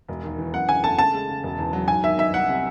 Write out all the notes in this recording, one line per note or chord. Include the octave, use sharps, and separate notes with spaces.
E1
D#2
E3
F#2 F#5
C#3 G#5
A3 A5
C#3 A5
G#3
C#3
E1
E2
F#3
G#2 G#5
D#3 E5
D#4 E5
C2 F#5
C3